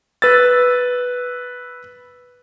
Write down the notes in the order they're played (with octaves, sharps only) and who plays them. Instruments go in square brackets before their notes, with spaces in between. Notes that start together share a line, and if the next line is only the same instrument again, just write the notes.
[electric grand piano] B4 E6 A6